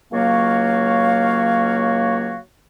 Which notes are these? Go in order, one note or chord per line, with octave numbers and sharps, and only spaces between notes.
C#2 F#3 A#3 F#4 C#5 F5